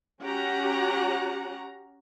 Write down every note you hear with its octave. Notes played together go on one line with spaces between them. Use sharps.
C#4 F#4 G4 F#5 A#5